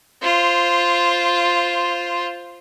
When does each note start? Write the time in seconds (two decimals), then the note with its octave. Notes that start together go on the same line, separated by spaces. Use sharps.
0.22 F4 C5